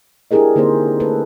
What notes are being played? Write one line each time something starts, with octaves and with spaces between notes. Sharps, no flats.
D4 E4 G4 G#4 A#4 D#5
D3 A#3 C4 D#4 C5
A3 A4 B4